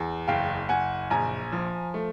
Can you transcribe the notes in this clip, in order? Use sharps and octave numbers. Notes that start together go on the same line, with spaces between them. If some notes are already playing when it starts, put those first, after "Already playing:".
Already playing: E2
F#1 F5 G5
F#1 F#5 G#5
A#1 G#5 A#5
F3
A3